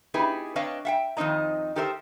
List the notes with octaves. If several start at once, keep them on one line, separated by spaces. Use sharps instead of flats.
B3 D#4 E4 G4 G#4 B4
C4 D4 B4 C#5 D#5 F5
E5 F#5 G5
F2 D#3 C4 D#4 D#5 A#5
D#4 G4 A4 A#4 C5 E5